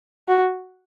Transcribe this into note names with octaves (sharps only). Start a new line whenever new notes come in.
F#4